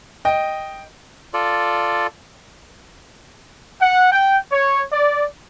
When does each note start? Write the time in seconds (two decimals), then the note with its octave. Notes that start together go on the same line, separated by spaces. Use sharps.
0.25 D#5 G5
1.34 F4 A4 D5
3.81 F#5
4.12 G5
4.52 C#5
4.91 D5